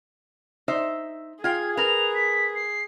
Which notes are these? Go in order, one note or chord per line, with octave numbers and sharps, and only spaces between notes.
D#4 C5 E5
F4 G#4 F5 G5 G#6
A#4 B4 F7
B6
C7